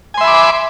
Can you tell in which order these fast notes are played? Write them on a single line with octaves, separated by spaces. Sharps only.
G#5 C6 E5 B5 D6